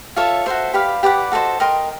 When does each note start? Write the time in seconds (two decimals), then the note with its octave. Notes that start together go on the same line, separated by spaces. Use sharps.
0.16 F4 A4 C#5 E5
0.46 F#4 A4 C5 E5
0.74 G4 B4 D5 F5
1.03 G4 B4 D5 F#5
1.32 F#4 A4 C5 D#5
1.60 A#4 D#5 G5 C6